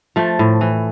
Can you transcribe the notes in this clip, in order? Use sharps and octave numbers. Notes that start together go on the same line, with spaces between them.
F3 A3
A2
E3